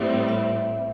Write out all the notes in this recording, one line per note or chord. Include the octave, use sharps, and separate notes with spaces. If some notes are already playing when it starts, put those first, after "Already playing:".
Already playing: A2 G3 C4 E5
E5